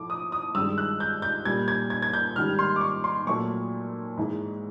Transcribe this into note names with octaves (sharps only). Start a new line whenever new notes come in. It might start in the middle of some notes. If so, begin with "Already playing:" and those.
Already playing: A2 F3 A3 D6
D#6
D#6
G2 D#3 G#3 E6
F#6
G6
G6
A#2 G3 G#6
G#6
G#6
G#6
G6
G#2 D#3 G3 F6
C6
D6
C#6
C6
A#2 F#3 A3 C#6
G#2 E3 G#3